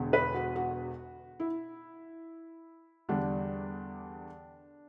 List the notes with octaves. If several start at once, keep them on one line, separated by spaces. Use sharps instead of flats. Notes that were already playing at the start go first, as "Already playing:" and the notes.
Already playing: E1 E2 D3
B4
F#4
F#4
E4
E2 D3 G3 D4